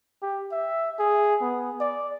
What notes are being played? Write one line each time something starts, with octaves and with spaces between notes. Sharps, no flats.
G4
E5
G#4
B3
D5